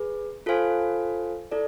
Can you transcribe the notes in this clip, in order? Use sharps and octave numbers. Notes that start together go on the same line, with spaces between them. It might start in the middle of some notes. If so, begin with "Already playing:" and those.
Already playing: G#4 B4
F4 A4 C5 F5 G#5
E4 A4 D5